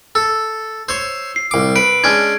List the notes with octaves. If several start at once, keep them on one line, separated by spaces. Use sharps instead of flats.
A4
C5 C#5 E6
C7
C2 D6
B4 D7
G#3 C#4 D4 G#6